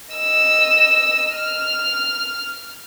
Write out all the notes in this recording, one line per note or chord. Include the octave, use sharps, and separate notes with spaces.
D#5 E6
F6